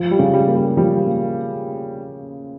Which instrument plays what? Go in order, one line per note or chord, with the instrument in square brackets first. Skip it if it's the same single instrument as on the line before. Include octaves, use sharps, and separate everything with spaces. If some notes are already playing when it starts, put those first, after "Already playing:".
Already playing: [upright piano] F3
[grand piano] G3
[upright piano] C#3
[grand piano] G3
[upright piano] A#3
[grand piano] G3
[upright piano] F3 [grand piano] G3
[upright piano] A#3